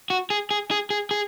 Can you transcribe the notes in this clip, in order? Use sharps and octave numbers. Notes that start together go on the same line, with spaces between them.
F#4
G#4
G#4
G#4
G#4
G#4